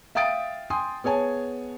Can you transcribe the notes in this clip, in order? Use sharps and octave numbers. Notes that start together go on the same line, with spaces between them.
E5 F5 G5 D#6 A6 D7
G5 G#5 C6 D#6
B3 G#4 C#5 G#5 A5